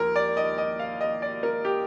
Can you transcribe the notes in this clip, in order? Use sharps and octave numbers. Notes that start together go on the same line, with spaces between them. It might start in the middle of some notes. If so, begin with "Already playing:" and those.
Already playing: D#2 F3 A#4
D5
D#5
D#5
F5
D#5
D5
A#4
G4